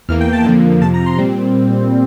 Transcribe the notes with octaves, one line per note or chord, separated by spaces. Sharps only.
E2 E3 A#3 F6
G5
A5
F2 D3 F3 A#3
F2 C3 F3 A5
A#5
C6
A#2 G3 C4